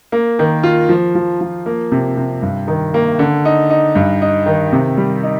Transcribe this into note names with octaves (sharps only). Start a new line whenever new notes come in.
A#3
D#3
F4
F3
F3
F3
A#3
C3
C3
G2
D#3
A#3
D3
D#4
D#4
G2
D#4
D#3
C3
G3
D#4